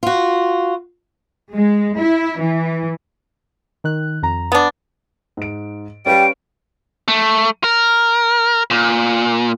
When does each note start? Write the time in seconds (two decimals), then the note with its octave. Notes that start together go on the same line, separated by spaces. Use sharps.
0.03 F4 F#4
1.54 G#3
1.98 E4
2.39 E3
3.84 D#3 F#6
4.22 F2 A#5
4.52 B3 D4
5.37 G#2 D7
6.06 G3 C#4 B4 F5 G5 D7
7.08 A3
7.64 A#4
8.70 A#2